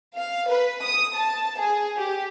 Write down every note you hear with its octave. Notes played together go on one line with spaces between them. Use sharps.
F5
B4
D#6
A5
G#4
G4